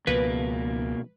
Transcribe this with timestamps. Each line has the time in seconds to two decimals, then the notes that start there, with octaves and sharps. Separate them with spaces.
0.07 C#2 B2 F3 A#3 B4